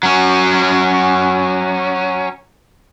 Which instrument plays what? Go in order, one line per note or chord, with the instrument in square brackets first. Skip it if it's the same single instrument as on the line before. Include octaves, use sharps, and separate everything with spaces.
[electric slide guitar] F#3 C#4